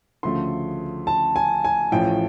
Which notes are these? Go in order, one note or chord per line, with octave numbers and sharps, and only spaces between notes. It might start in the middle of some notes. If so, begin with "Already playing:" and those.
D2 C#3 F3 A3 C6
A5
G#5
G#5
A1 A2 F3 A3 G5